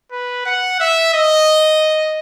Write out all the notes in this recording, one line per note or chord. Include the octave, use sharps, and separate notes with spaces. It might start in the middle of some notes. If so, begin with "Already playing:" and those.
B4
F#5
E5
D#5